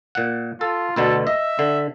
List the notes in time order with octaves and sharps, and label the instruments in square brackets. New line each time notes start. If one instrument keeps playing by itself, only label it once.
[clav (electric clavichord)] A#2 F#5
[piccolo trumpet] F4 [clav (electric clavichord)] A4
[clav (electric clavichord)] D2 B2 D3 [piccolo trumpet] A4
[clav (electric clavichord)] D#5 [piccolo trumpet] E5
[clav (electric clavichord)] D3